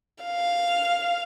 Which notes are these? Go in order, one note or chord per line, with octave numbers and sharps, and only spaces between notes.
F5